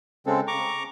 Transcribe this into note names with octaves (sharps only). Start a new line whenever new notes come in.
C#3 G#3 C4 A4
A#5 C#6 D6